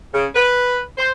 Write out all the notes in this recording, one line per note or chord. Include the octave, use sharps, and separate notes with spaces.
C#3
B4
C5